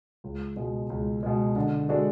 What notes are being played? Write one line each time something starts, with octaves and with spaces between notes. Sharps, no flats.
C#2
B2 G#3
C#2
B2 G#3
D3
G#3 D4 F#4 A4